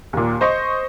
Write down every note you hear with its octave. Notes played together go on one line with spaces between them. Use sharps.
D#2 A#2
C5 D#5 C#6